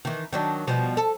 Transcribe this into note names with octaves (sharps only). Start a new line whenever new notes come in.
D#3 E3
D#3 F#3 D4
B2 F3 G3
A4